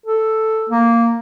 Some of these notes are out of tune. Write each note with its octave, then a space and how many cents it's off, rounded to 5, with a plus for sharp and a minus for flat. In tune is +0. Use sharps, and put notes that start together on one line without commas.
A4 +0
A#3 -5